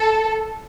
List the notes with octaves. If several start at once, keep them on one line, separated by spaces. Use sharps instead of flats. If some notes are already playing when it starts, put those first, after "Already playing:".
Already playing: A4